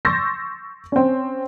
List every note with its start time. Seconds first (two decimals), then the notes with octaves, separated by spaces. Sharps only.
0.05 C6 C#6 E6 G6 A6 A#6
0.92 C4 C#4